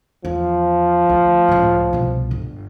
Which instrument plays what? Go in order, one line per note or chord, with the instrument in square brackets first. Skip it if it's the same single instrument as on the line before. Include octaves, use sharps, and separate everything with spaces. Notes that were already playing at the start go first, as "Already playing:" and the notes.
[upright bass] E2 [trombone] F3
[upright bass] D2
C#2 A2
C2 B2
G1